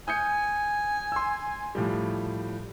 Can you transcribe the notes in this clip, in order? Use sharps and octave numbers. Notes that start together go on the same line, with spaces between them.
G#5 D#6 G6 C#7
C6 E6
A2 F3 G3